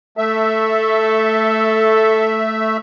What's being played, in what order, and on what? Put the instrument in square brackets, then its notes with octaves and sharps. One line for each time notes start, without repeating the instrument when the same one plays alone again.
[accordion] A3 E5 [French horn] A4